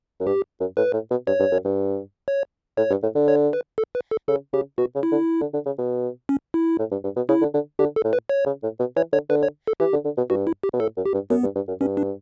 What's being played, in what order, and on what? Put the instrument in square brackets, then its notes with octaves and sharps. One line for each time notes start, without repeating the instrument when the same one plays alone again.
[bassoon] F#2
[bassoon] G2 [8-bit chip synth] G4
[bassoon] F#2
[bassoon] A2 [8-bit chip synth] B4
[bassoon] A2
B2
[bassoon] G2 [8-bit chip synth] C#5
[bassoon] G2
F#2
G2
[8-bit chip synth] C#5
[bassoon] A2 [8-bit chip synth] C#5
[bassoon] G2
A2
D3
[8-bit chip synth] C#5
B4
A4
B4
A4
[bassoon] C#3 [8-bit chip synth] A4
[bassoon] C#3 [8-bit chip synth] G4
[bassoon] B2 [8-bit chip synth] F#4
[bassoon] C#3
[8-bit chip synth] E4
[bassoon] D3
D3
D3
C#3
B2
[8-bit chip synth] C#4
E4
[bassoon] A2
G2
G2
B2
[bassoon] C#3 [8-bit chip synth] E4
[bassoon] D3
D3
[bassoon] D3 [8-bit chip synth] G4
[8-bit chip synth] A4
[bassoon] A2
[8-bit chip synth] B4
C#5
[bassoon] C#3
A2
B2
[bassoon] E3 [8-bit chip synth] C#5
[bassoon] D3 [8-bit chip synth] C#5
[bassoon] D3 [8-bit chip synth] B4
[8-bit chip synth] C#5
A4
[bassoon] E3 [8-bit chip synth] G4
[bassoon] D3
D3
B2
[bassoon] G2 [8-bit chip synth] F#4
[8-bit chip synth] E4
G4
[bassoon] B2
[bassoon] A2 [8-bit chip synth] A4
[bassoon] F#2
[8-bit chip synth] G4
[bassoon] G2
[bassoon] F#2 [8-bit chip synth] B3
[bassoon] G2
G2
F#2
[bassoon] G2 [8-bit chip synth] C#4
[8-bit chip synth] D4